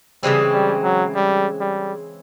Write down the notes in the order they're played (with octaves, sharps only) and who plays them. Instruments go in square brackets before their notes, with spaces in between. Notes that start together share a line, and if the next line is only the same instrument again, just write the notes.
[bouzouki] C#3 E3 G#3 C4 [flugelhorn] G3
[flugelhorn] G3
F#3
G3
G3